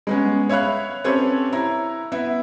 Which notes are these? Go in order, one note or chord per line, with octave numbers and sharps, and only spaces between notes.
G#3 B3 C#4
C#5 E5 F5 B5 F#6
C4 C#4 G4 A4 B4 C#5
E4 A#5
B3 E4 E5